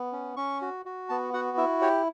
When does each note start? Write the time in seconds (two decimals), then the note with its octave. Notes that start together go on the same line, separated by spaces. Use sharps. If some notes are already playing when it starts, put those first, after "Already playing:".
Already playing: B3
0.12 C#4
0.37 C#4 C#6
0.62 F#4
0.86 F#4
1.09 B3 A5
1.33 F#4 F#5
1.57 E4 E5
1.82 G4 C#5